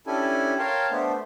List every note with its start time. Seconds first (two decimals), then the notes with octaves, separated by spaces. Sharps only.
0.07 C#4 D4 E4 G4 A4 G#5
0.59 A#4 C#5 F5 G5 A5 C6
0.91 A3 B3 D4 C5